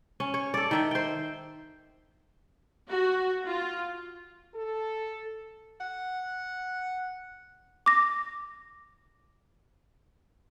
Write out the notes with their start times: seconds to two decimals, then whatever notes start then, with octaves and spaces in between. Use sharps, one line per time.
0.20 C#4
0.34 C#5
0.54 A4 D5
0.71 D#3 E5 G5
0.91 C5 G5
2.88 F#4
3.44 F4
4.55 A4
5.80 F#5
7.86 D6 A#6